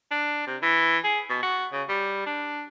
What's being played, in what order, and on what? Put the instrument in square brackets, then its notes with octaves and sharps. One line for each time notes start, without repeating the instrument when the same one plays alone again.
[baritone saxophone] D4
C3
E3
G#4
B2
F#4
C#3
G3
D4